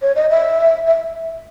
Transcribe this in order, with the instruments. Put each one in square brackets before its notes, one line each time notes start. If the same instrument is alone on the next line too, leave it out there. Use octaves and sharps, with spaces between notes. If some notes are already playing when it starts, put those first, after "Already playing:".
[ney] C#5
D#5
E5
E5